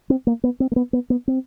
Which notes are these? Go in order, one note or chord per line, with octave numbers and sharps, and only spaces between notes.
C4
A#3
B3
C4
A#3
B3
B3
B3
C4